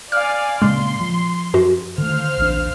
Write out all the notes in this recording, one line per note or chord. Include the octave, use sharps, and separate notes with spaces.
D5 F5 G#5 F6
A#2 C#3 G#3 C6
F3
F#2 F#4
D3 D#3 A3 C5 F5 F6
A#1 E2 D4